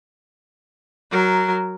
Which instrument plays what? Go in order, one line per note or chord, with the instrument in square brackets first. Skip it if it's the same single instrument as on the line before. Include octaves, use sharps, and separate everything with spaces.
[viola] F#3 A#4